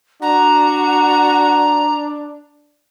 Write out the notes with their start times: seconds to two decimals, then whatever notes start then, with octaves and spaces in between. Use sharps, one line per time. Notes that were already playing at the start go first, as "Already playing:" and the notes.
0.22 D4 F#4 A#5